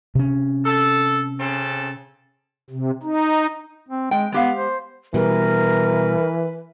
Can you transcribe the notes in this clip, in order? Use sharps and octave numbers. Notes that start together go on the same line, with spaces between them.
C3 C#4
A4
C#3 C4 A4
C3
D#4
C4
G#3 G5
G#3 B3 G4 F5
C5
B2 E3 G3 A#4 B4